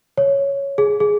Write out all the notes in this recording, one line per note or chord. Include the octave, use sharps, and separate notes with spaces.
C#5
G#4
G#4